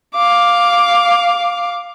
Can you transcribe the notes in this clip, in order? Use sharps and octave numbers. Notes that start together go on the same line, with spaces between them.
F5 D6